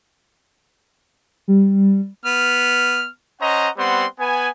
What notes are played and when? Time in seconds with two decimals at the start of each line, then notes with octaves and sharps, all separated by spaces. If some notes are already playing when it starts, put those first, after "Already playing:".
1.48 G3
2.25 B3 F6
3.42 C#4 C5 D#5 F#5 A#5
3.77 G3 B3 C4 F#5 C6
4.19 B3 B4 G#5